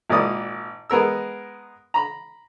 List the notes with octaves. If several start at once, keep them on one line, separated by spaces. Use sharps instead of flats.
G#1 A#2 E4 D5 D#6
G#3 B3 A#4 E6
A#5 B5